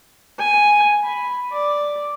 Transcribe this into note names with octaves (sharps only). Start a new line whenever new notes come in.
G#5
B5
D5